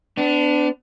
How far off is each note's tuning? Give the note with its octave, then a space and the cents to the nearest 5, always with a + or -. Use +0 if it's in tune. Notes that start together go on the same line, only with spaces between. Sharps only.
B3 +40 D4 +0